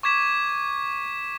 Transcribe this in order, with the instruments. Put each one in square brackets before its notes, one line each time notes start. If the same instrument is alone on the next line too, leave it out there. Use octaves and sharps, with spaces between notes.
[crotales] C#6 D6 G#6 B6 E7